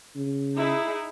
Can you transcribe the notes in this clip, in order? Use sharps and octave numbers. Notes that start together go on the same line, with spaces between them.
C#3
D#4 E4 G#4